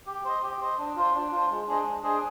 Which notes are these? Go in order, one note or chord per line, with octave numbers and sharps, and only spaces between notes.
G4
C5 D#5
G4
C5 D#5
D4
F4 C5
D4
F4 C5
G#3
D4 G#4 C5 D#5
G#3
D4 G#4 C5 D#5